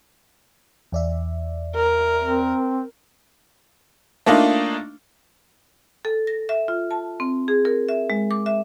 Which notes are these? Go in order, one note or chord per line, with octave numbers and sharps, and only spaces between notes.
E2 D5 E5
A#4
C4
A3 A#3 D4 D#4 F4
A4
A#6
E5
F4
A5
C4
G#4
A#4
E5
G#3
D6
E5